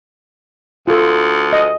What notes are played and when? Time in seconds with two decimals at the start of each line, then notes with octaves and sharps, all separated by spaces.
0.88 D2 F4 A4
1.53 D#5